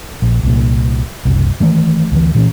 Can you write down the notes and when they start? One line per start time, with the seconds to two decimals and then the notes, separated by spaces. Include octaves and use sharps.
0.22 A#1
0.43 C2 A#2
1.25 F#1 C2
1.60 D#3 E3 A3
2.12 D2 E3
2.35 A#2 E3 C#4